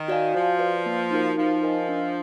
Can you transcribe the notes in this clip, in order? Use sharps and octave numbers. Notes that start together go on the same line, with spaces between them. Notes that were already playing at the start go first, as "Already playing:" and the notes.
Already playing: D#3
F#4 D5 F5 G#5
F3 F#4
B4 D5 F5
A#3
D#4 F#4 A#4
F3 D#4
A#4 D#5 G#5
D4